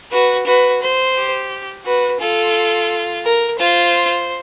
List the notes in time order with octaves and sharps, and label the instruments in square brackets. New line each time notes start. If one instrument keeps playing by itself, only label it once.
[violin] F#4 [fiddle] B4
[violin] F#4 [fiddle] B4
[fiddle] C5
[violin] G4
[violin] F#4 [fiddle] B4
[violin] F4 [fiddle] A4
[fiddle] A#4
[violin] F4 [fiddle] C5